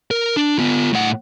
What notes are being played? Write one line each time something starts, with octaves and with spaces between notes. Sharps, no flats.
A#4
D4
B3 F4
A2 F#5